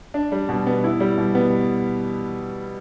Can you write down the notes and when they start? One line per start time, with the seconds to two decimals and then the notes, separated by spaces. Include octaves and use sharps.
0.14 D4
0.32 G3
0.49 B2
0.67 B3
0.84 E4
1.00 G3
1.18 B2
1.35 B3